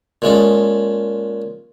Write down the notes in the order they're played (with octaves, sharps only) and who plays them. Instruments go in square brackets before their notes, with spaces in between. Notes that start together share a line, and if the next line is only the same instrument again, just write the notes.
[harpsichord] A#2 G#3 C#4 A4